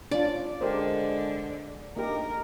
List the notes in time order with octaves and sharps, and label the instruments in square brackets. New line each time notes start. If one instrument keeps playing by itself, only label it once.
[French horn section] A2 C#4 [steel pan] D4 F4 [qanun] D5
[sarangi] D3 [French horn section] G#3 [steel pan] G4 A#4 C5
[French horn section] A3 D4 D#4 [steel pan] A#3 G4 [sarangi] A#4